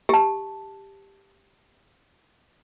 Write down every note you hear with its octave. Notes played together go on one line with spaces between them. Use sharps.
G4 A5